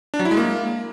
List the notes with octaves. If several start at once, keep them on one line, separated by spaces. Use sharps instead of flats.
D4
F#3
E4
G#3
A#3